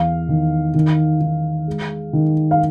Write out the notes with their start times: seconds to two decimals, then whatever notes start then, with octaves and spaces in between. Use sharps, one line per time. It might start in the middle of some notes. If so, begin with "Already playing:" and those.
Already playing: E2 F5
0.29 D#3
0.74 D#3
1.21 D#3
1.68 G#3
2.13 D#3
2.51 F5